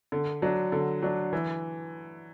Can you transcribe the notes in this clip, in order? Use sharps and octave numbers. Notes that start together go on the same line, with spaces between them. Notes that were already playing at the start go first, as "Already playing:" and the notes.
D3
F#3 D4
D3
F#3 D4
E3